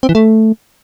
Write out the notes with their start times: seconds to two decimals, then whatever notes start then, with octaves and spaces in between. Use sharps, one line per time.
0.03 C4
0.09 E3
0.15 A3